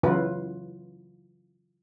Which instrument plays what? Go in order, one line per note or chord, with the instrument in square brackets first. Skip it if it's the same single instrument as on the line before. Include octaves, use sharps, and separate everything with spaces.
[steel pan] C#3 E3 F#3 E4 F4 B4